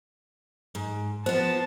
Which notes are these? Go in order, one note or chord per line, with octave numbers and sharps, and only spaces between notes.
G#2
F3 B3 C5 A5